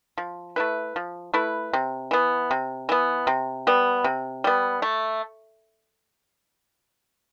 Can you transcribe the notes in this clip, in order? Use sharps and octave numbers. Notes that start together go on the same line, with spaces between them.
F3
A3 E4 B4
F3
A3 E4 B4
C3
E3 B3
C3
E3 B3
C3
G3 B3
C3
G3 B3
A3